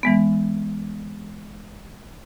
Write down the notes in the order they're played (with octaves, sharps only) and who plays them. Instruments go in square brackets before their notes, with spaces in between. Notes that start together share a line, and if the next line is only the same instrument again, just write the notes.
[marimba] E3 G#3 B3